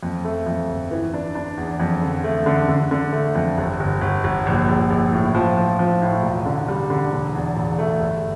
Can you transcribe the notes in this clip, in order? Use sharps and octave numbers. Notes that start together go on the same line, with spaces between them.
F2
A3
F2
G1
E3
D4
D4
E2
F2
D3
A3
D3
D3
D3
A3
F2
G1
G1
G1
G1
A#1
A#1
A#1
A2
F3
F3
F3
A2
E1
D3
G3
D3
E1
E2
E1
A3
G1